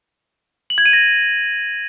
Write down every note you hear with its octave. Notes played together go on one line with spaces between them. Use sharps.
F#7
G#6
D#7
A#6